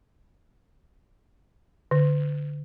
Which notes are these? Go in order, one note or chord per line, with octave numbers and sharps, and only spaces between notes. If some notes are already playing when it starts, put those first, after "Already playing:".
D3